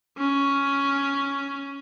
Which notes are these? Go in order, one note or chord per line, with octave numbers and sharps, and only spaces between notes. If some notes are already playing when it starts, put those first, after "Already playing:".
C#4